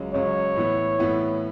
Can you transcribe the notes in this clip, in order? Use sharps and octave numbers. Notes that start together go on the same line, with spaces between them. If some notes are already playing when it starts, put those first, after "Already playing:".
Already playing: C#2 C#3 F#3
C#2 C#3 F#3 C#5
A2 E3 B3 E4
A2 E3 B3 E4